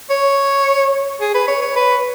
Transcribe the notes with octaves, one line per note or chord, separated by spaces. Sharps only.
C#5
G#4
B4
C#5
C#5
B4